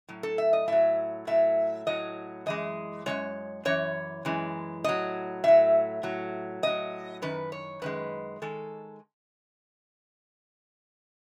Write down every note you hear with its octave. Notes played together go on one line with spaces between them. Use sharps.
A2 F#3
A4
E5
D#5
A2 F#3 E5
A2 F#3 E5
A2 F#3 D#5
F#2 E3 G#3 D#5
F#2 E3 G#3 C#5
F#2 E3 C#5
F#2 E3 G#3
A2 F#3 D#5
A2 F#3 E5
A2 F#3
A2 F#3 D#5
F#2 D#3 B4
C#5
F#2 D#3 G#3 B4
D#3 G#3 A4